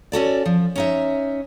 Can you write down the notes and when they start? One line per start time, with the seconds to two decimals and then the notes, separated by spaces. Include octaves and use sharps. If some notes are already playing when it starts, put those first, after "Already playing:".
0.12 C#4 F#4 A4 D5
0.46 F3
0.76 C#4 D#4 E5